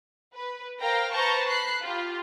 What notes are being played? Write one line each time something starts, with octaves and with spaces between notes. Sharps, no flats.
B4
A#4 C5 F5 G5 A#5
B4 C5 A5 A#5 C#6 G6
B5 F#6 C7
F4 G4